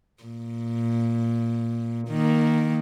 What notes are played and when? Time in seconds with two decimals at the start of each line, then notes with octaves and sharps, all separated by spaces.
0.24 A#2
2.08 D#3 A#3